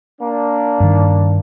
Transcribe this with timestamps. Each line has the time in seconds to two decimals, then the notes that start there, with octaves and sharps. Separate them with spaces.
0.21 A#3 D4
0.80 G2 D#3